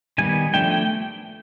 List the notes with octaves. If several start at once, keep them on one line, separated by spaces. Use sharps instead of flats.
D#3 G3 B3 G#5
F3 A3 D4 G5
G5